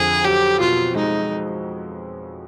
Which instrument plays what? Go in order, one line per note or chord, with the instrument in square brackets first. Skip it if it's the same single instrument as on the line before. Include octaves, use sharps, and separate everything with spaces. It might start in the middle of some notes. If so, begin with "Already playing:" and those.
Already playing: [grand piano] F2 D3 [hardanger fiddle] G#4
[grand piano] F#3 [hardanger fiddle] G4
[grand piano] B2 [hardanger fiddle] F4
[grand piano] G#3 [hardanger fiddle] D#4